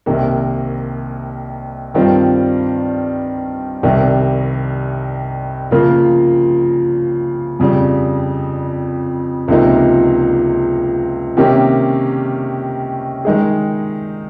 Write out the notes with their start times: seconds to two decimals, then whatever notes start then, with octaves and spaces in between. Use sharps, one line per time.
0.06 C2 C3 D#3 A#3
1.94 G2 D#3 G3 C4 F4
3.83 C2 C3 D#3 G3
5.71 C#3 F3 A#3 F4 A#4
7.59 F2 C#3 G3
9.48 C#2 C3 F3 A#3 D#4
11.37 C3 D#3 A#3 C#4 G4
13.25 D#3 G#3 D#4 G#4